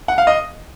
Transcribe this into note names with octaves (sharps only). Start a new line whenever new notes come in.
F#5
F5
D#5